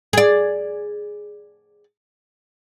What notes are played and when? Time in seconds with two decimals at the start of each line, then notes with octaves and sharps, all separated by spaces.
0.13 G#4 D5